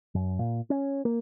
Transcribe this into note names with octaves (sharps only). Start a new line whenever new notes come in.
F#2
A#2
C#4
A#3